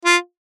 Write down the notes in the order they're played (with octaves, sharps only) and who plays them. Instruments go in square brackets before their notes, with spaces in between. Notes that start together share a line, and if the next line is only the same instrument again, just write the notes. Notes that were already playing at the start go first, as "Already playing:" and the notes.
[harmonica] F4